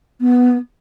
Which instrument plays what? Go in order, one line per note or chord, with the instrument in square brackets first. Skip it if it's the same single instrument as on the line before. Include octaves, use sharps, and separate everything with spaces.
[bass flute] B3